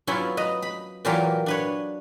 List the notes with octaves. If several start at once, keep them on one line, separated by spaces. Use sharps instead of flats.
F#3 B3 C#4 E4 F4 C#5
B4 D#5 A#5
B5
A#2 E3 F#3 F4 G4 A#4
D4 B4 C#5